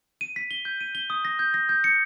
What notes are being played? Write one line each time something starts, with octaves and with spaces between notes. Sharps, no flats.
D#7
B6
G7
G6
D#7
G7
D#6
A#6
G6
A#6
G6
C#7